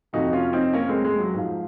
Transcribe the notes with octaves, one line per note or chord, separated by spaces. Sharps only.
F2 C3 F3 D#4 F#4
C#4 F4
C4 D#4
A#3 C#4
G#3 C4
G#3
F#3
G#2 F3